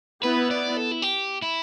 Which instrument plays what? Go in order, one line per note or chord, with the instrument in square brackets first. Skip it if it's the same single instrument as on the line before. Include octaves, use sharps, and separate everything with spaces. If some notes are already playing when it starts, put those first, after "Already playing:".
[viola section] B3 E4 [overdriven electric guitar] B4
[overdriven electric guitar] D5
A4
E4
G4
E4